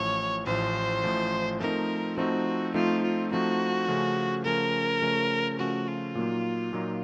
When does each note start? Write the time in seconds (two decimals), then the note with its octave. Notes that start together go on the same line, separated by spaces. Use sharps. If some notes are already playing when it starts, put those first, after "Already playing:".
Already playing: A1 A2 F3 C#5
0.47 A1 A2 F3 C5
1.04 A1 A2 F3
1.60 F3 A3 C4 D#4 A#4
2.17 F3 A3 C4 D#4 F#4
2.74 F3 A3 C4 D#4 F4
3.02 F4
3.31 F3 A3 C4 D#4 F#4
3.88 C#3 F3 A3 C#4
4.45 C#3 F3 A3 C#4 A#4
5.01 C#3 F3 A3 C#4
5.59 C#3 F3 A3 C#4 F#4
5.87 F4
6.15 A#2 F#3 A#3 D#4
6.73 A#2 F#3 A#3 D#4